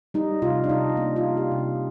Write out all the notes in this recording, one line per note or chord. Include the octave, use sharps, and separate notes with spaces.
G3 D#4
C3 F4
D4
C3 D#4
A#3 D4
F4
G3
G4
C3
D4